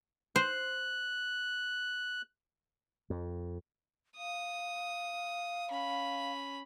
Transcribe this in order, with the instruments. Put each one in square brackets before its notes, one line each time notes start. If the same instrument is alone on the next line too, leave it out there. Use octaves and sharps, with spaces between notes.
[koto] C5 [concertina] F#6
[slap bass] F2
[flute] F5 [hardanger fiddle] D#6
[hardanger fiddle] C#4 B5